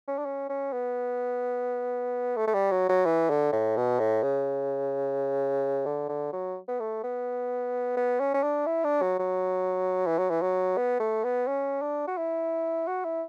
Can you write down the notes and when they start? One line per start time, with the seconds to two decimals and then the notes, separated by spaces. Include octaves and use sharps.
0.08 C#4
0.18 D4
0.26 C#4
0.49 C#4
0.73 B3
2.37 A3
2.47 A3
2.54 G3
2.71 F#3
2.89 F#3
3.06 E3
3.30 D3
3.53 A2
3.76 B2
3.99 A2
4.23 C#3
5.86 D3
6.09 D3
6.33 F#3
6.68 B3
6.80 A3
7.04 B3
7.97 B3
8.20 C#4
8.34 C#4
8.43 D4
8.66 E4
8.85 D4
9.02 F#3
9.19 F#3
10.07 E3
10.18 F#3
10.30 E3
10.42 F#3
10.77 B3
11.00 A3
11.24 B3
11.47 C#4
11.82 D4
12.07 F#4
12.17 E4
12.87 F#4
13.05 E4